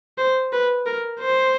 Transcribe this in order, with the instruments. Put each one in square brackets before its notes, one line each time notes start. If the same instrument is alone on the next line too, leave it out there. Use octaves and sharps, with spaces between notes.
[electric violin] C5
B4
A#4
C5